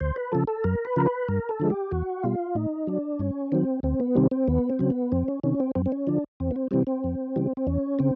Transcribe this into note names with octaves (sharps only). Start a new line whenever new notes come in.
D2 C5
B4
C#3 F3 A4
A4
F#2 A#4
B4
C#3 F3 A#4
B4
G2 A#4
A4
D3 F3 G#3
G4
E2 F#4
B2 G3 F4
A2 D#4
F#3 D4
G2 C#4
D#3 F#3 C4
D2 C4
B3
C3 D#3 G3 C4
C4
D#2 B3
C4
C#3 F#3
B3
F2 C4
C#4
C3 D#3 C#4
C4
F#2 C4
C4
C#4
D3 F3 D4
E2 C4
B3
C4
C3 E3 G3 C4
C4
F2
C#3 E3 G3
C4
E2 C#4
C#3 C4